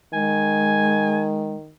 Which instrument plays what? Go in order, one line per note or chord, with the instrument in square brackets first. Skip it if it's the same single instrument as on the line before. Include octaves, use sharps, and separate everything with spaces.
[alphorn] D#3 [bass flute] G#3 [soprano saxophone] G#5